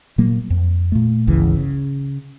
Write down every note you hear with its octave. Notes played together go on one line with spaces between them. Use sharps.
A#2 F#3 A#3
F2
A#2 A3
G1 C#2 C#3 E3
C#3